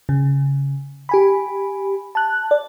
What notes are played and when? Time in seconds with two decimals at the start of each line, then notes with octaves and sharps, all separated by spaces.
0.09 C#3
1.09 G4 G#5 B5
2.15 A5 F#6
2.51 D5